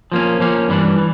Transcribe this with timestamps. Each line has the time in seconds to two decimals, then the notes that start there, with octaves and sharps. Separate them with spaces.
0.12 F3 A#3 C#4
0.40 F3 A#3 C#4
0.68 G2 E3 G3 D4
0.98 E3